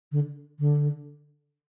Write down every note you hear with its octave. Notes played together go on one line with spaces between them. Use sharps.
D3
D3